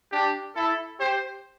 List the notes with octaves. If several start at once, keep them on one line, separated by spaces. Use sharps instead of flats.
D4 G4
E4 A4
G4 C5